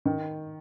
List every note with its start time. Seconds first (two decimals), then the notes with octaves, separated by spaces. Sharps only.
0.06 D#3